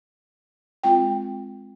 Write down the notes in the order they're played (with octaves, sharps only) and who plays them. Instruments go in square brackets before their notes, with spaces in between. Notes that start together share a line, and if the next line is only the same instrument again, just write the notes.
[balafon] G#3 C4 F4 G5